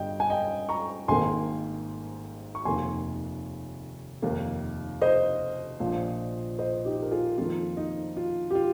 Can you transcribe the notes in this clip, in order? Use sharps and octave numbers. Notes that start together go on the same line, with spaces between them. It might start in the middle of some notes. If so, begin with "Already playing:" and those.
Already playing: G1 G2 G3 D#5 G5
G#5
D#5 G5
A#5 C#6
G#1 G#2 D#3 A#3 G#5 C6
C#6
F1 D#2 D#3 A#3 G#5 C6
F1 D#2 D#3 A#3
C5 D#5
A#1 A#2 F3
C5 D#5
D#4 G4
A#4
F4 G#4
F2 D#3 A#3 F4
D#4
F4
G4
F4